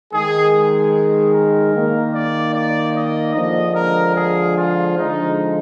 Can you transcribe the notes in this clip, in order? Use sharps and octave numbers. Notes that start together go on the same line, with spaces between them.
D#3 G#3 G#4
G#4
A#4
D#3 A#3
D5
D5
D#5
D3 F3 G#3 D#5
A#4
G#4
F4
D3 F3 G#3 D#4